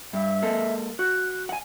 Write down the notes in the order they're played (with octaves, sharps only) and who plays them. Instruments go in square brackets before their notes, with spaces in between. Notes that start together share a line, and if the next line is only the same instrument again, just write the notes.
[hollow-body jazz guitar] G2 [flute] E5
[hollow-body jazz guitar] G#3 A#3 A4
[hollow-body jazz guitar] F#4 [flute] F#6
[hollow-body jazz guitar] F#5 G#5